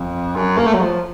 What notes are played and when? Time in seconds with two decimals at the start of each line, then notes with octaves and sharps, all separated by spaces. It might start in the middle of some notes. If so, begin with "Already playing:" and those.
Already playing: F2
0.36 F#2
0.58 A#3
0.67 A3
0.74 F#3
0.81 F3